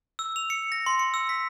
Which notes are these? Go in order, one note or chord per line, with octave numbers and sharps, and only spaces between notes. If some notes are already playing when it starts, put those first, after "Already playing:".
E6
F7
C#7
A#6
C6
C#7
E6
B6